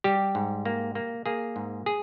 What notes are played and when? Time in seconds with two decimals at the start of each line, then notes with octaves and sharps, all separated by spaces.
0.04 G3 G4
0.35 G#2
0.65 A#3
0.95 A#3
1.26 A#3 G#4
1.56 G#2
1.86 G#4